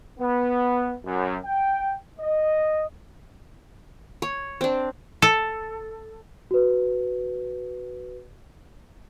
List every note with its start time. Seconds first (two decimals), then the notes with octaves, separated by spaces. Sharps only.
0.20 B3
1.05 F#2
1.45 G5
2.19 D#5
4.22 C#5
4.61 C4 D4
5.22 A4
6.51 F#4 B4